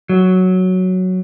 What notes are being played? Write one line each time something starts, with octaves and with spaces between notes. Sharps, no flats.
F#3